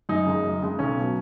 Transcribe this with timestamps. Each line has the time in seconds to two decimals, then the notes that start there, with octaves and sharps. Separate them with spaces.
0.09 F#2 D#4
0.26 C#3 G#3
0.43 F#2
0.62 C#3 G#3
0.79 B1 C#4
0.97 B2 F#3